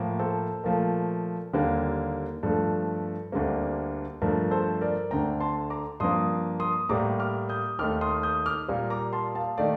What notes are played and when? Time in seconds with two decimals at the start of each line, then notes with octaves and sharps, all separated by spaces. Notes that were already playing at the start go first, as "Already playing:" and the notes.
Already playing: A2 F3 A#3
0.19 A4 C5
0.64 A#2 F3 A3 A#4
1.53 D#2 D3 G3 A#3
2.43 G2 F3 A3 A4
3.32 D2 D3 G3 A#3
4.22 G2 F3 A3 A#4
4.51 A4 C5
4.81 A#4 D5
5.11 D2 D3 A3 G5 A#5
5.40 A5 C6
5.70 A#5 D6
6.00 G2 F3 A#3 C6 D#6
6.60 C6 D#6
6.89 A2 G3 A#3 A#5 D6
7.20 D6 F6
7.49 D#6 G6
7.79 D#2 D#3 A3 D6 F6
8.01 C6 D#6
8.23 D#6 G6
8.46 D6 F6
8.68 A#2 G3 A#3
8.90 A#5 D6
9.13 A5 C6
9.35 F5 A5
9.57 D#3 A3 D5 F5